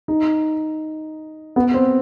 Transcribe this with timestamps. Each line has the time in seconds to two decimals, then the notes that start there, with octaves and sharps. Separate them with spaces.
0.08 D#4
1.56 B3
1.74 C4